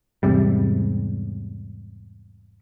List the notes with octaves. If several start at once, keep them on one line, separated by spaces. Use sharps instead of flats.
E2 G#2 C3 G3